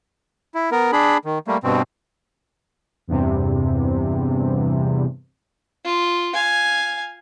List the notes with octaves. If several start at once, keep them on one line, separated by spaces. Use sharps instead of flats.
E4
B3 A#4
D4 G#4 B5
D#3
G3 A3 A#3
G2 B2 C4
E2 G2 C3
F4
F5 G#5